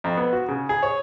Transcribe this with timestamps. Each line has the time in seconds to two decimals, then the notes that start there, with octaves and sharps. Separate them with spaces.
0.04 F2
0.17 B3
0.33 F#4
0.48 C#3
0.69 G#4
0.83 C#5